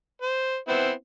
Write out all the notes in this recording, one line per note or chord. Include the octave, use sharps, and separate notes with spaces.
C5
B3 C4 E4